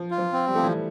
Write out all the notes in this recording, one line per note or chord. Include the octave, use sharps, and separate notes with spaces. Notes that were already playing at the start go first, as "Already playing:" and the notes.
Already playing: F3
F4
F3
C4
G3
F3 A3
E3 G3